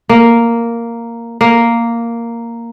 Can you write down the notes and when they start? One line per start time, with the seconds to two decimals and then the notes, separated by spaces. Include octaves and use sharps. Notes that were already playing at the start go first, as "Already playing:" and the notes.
0.09 A#3
1.41 A#3